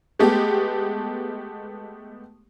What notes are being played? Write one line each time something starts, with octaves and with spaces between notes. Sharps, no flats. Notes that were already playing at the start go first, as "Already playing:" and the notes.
G#3 A3 B3 G4